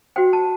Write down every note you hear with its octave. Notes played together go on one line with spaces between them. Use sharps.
F#4 C5 G5
A5